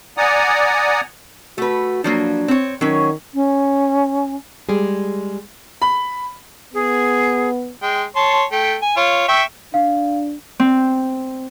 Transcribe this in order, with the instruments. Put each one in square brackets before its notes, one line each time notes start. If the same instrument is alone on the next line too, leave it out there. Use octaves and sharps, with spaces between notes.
[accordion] D5 F#5 G#5 A#5 D#6
[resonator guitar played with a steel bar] A3 B4 [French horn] F#4
[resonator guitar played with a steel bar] F3 F#3 A#3 [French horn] D4
[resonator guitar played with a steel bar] C4 C#5
[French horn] D#3 [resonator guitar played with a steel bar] F#3 C#4
[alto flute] C#4
[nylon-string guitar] G3 G#3 G#4
[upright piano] B5
[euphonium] B3 [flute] G#4
[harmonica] G#3 G5
C#5 A5 C6
A3 G5
G#5
F4 C#5
E5 G5 C#6
[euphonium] D4 [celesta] F5
[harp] C4